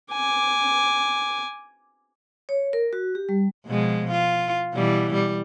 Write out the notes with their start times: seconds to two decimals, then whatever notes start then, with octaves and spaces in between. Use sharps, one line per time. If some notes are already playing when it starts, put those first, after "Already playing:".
0.11 G#5 D6
2.49 C#5
2.73 A#4
2.93 F#4
3.15 G4
3.29 G3
3.66 B2 F3 G#3
4.11 F4
4.73 B2 E3 G3
5.13 G3